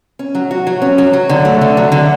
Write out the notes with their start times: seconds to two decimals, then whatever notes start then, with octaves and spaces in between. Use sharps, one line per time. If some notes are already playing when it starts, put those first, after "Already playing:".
0.19 C#4
0.35 F#3
0.51 F#4
0.67 F#3
0.82 C#4
0.98 F#3
1.13 F#3
1.29 D3
1.45 A3
1.61 D3
1.77 F#3
1.92 D3